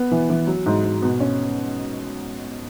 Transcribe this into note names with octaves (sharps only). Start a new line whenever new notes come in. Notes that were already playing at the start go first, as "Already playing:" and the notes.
Already playing: B3
E3
E3
F#3
G#2
G#2
B2
C#4